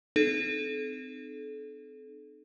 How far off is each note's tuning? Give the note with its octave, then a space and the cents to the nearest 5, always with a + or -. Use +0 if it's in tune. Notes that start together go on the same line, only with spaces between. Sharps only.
C4 -25 D#4 -35 A4 -30